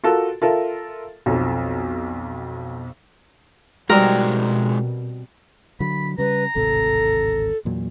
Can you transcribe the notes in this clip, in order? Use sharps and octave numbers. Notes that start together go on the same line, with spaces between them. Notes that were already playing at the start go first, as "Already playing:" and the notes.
F4 F#4 A4 A#4
F4 A4 A#4 E5
B1 F2
G#2 B2 F3 G3 G#3 C4 F#4 A#4
D3 F#3 B5
C#3 G3 B4 A#5
D1 G#1 C3 A4
E2 A#2 F#3